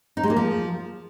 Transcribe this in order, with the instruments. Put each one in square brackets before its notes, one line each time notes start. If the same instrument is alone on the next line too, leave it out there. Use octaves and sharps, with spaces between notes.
[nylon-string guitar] D#4
G#3
A#3
F3